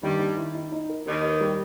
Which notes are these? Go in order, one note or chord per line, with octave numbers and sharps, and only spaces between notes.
G2 D#3 G3
D#3
E4
D#4
D#4
A#4
D#2 D#3 G4
B4
G3